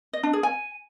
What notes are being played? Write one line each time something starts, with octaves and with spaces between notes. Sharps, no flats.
D#5
D4
G#4
G#5